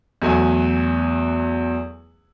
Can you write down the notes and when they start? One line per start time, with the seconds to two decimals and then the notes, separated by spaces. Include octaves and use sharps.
0.22 E2 F#3 A3 G#5